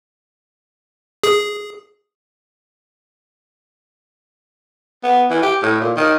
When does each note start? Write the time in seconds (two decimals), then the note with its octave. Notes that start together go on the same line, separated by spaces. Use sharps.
1.23 G#4
5.04 B3
5.31 E3
5.43 G4
5.62 A2
5.81 A#2
5.96 D#3